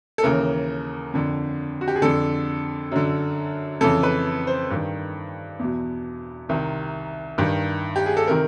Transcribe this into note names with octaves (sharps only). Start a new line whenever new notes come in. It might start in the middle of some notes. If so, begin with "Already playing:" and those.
A4
D#2 C#3 E3 A#4
F2 D3
F#4
G4
G#4
F2 D3 A4
F#2 D3
F2 C#3 E3 A4
B4
C5
G2 D#3
E2 B2
C2 C3 D#3
G2 D#3
G4
G#4
A4
C3 D#3 A#4